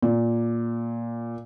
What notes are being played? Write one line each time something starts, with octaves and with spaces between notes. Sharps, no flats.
A#2